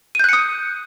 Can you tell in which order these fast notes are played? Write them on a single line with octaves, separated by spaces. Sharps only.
D#7 G6 F#6 C#7 D#6